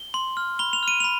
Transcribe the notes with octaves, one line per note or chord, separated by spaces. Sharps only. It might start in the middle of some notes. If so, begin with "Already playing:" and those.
Already playing: G7
C6
F6
B5 G7
F7
F6 D#7
B5 F7